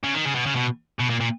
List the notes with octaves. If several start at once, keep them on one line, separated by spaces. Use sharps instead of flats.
C#3
D#3
C#3
B2
C#3
B2
B2
A#2
A#2